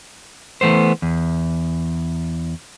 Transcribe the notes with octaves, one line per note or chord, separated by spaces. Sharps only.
E3 A3 B3 C5
E2